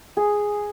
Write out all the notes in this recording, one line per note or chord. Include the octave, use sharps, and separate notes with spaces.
G#4